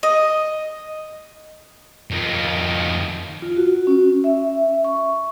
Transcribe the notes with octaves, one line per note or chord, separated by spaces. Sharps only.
D#5
F2 D#3
F4
F#4
C#4
E5
C#6